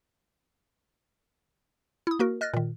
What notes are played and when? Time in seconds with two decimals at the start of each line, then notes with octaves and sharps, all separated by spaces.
2.07 E4 D#6
2.19 A#3 F#4 A#4
2.41 D#5 F6 F#6 A6 A#6
2.54 A#2 D#3